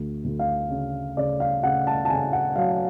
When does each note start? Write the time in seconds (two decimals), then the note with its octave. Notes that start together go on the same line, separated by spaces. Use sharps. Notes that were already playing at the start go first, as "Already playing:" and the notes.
Already playing: D2
0.24 D2
0.39 F5
0.70 C#3
1.17 C#3 D5
1.40 F5
1.63 C#3 F#5
1.87 A5
2.05 A5
2.10 C#3 G#5
2.33 F#5
2.56 F#3 F5